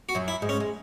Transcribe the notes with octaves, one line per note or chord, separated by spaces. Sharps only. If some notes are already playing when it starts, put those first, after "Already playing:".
F#4
F#2 F#3
E4
G#2 G#3
C#4
G#3